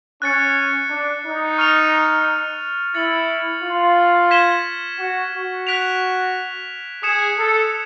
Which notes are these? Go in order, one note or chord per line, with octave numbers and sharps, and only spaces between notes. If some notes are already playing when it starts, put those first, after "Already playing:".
C#4 F#6 A6 C#7
D4
D#4
C#6 F6 A6 C#7 F7
E4 A6 C#7 F#7
F4
G#6 B6 E7 G7
F#4
F#4
F#6 B6 D7 F7
G#4 D#6 G#6 C#7 E7
A4